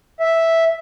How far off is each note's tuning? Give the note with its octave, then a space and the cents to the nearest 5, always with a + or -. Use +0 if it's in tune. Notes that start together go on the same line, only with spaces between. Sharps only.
E5 -5